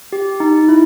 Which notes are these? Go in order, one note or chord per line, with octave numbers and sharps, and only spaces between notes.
G4
D#4
E4